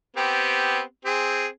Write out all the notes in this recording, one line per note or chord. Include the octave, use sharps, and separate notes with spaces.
B3 C4 G4
C4 G#4